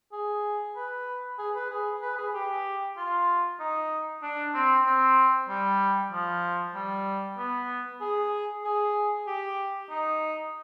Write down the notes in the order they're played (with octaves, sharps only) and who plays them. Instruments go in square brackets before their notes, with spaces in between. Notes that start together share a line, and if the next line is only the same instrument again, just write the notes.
[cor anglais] G#4
B4
G#4
B4
G#4
B4
G#4
G4
F4
D#4
D4
C4
C4
G3
F3
G3
B3
G#4
G#4
G4
D#4